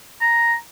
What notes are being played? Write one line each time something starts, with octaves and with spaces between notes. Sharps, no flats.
A#5